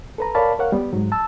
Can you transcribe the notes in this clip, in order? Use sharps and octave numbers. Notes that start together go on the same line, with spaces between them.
A4 B4 A#5
A#4 C#5 D5 F5 A5 B5
A#4 C#5 F5 F#5
G3 B3
G#2 F#3
A5 E6